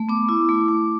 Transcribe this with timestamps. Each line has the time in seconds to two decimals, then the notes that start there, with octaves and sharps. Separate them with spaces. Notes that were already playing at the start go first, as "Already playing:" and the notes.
Already playing: A3
0.09 B3 D6
0.29 E4
0.49 A3
0.69 A3